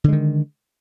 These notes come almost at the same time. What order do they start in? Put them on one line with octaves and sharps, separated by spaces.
D3 G#3 D#3